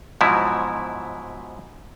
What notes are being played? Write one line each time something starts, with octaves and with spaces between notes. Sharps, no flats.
G#2 B2 F3 F#3 E4